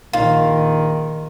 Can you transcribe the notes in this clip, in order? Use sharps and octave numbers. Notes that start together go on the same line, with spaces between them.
A#1 D#3 F4